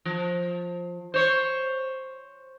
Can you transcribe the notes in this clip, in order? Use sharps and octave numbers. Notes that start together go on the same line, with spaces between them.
F3
C5 C#5